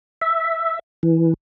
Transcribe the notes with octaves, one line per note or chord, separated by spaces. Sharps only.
E5
E3